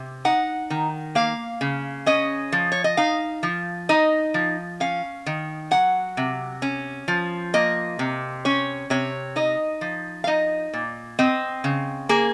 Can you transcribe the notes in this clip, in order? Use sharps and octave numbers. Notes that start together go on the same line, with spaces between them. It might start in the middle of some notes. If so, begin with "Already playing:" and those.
Already playing: C3
D#4 F#5
D#3
A#3 F5
C#3
C#4 D#5
F3
C#5
D#5
D#4 F5
F3
D#4 D#5
F3
C#4 F5
D#3
F#3 F#5
C3
C#4
F3
A#3 D#5
C3
C#4 C#5
C3 C#5
D#4 D#5
F3
F5
D#4 D#5
A#2
C4 D#5
C#3
A#3 G#4